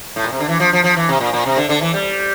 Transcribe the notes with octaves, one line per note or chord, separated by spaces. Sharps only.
A2
A#2
C3
D3
E3
F3
F3
F3
E3
C3
A#2
A#2
C3
D3
D3
E3
G3